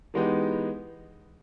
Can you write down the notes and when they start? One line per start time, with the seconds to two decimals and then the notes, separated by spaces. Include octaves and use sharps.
0.14 E3 G#3 B3 D#4 G4